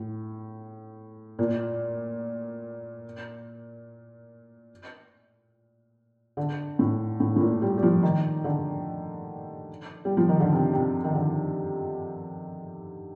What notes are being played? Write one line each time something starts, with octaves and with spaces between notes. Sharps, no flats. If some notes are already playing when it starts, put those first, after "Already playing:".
Already playing: A2
A#2
D3
A2
A2
A2
A#2
G3
G3
F3
D#3
D3
G3
F3
D#3
D3
C3
C3
D#3
D3